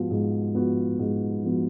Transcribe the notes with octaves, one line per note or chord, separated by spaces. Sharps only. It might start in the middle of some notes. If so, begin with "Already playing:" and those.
Already playing: G#2 F3 B3 F#4
G#2
F3 B3 F#4
G#2
F3 B3 F#4